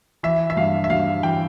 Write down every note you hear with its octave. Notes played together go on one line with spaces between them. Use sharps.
E3 E5
E5
G2 F5
E5
G2 F5
E3 G5